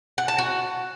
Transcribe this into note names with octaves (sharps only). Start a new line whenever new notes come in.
F#5
A5
F#4